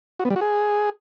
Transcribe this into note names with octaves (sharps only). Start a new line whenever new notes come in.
F#4
B3
G3
F#4
G#4